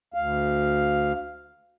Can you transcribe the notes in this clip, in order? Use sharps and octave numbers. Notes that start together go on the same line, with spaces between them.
D2 F5